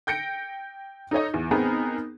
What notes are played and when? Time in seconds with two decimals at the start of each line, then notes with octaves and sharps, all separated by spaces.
0.07 G5 G6 A#6 C#7 D7
1.11 D#4 A4 C#5 D#5
1.34 E2
1.51 B3 C4 D#4 G#4 A#4